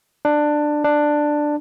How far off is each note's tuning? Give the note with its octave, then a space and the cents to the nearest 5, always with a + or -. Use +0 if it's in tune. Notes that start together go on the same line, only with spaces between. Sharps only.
D4 +15
D4 +10